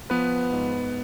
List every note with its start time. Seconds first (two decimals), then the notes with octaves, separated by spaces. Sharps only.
0.10 F3 B3 B4
0.53 G#2